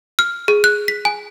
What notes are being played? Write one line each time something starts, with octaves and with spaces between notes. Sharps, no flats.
F6
G#4
F#6
B6
G#5